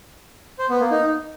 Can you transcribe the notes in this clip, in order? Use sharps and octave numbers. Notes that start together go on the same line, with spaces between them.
C5
B3
A#3
D#4